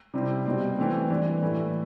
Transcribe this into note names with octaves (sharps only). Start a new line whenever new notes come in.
C3 G3 C4 E4
B2 G3 C4
E3 A3 C4
E3 G3 D4
A2 E3 A3 E4